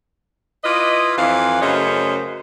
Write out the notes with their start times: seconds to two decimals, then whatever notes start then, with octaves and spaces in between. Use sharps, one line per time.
0.64 E4 F4 B4 D5 D#5
1.18 F2 E3 C5 D5 F5
1.62 F#2 C#3 A3 C5 C#5 D#5